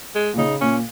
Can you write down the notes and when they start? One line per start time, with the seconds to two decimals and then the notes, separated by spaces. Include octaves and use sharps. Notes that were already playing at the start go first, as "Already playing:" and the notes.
0.15 G#3
0.34 A#2
0.38 C#3 D#4
0.61 A#2 C#4